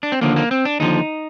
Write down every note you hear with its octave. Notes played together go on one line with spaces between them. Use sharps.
D4
C4
D#2 D3 F3 A#3
A#3
C4
D4
D#2 D3 F3 D#4